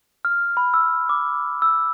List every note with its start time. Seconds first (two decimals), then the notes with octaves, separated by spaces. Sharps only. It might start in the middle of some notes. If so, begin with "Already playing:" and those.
0.25 F6
0.57 B5
0.74 E6
1.09 D6
1.62 E6